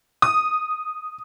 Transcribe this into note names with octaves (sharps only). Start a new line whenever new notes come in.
D#6